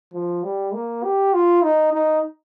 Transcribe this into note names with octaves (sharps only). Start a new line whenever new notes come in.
F3
G3
A#3
G4
F4
D#4
D#4